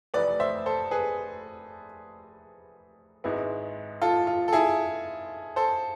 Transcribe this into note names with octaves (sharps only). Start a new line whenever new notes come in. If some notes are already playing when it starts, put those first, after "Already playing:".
F1 F2 E3 A3 B4 D5
C5 E5
A4 C5
G#4 B4
G#1 G#2 G#3 B3 E4
F4 A4
F4
A4
E4 G#4
A4 C5